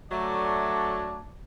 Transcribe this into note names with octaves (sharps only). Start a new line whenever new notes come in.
F#3 A3 D4 D5